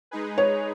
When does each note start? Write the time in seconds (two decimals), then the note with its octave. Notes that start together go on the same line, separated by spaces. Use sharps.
0.11 G#3 D#4 G#4 B4
0.38 C#5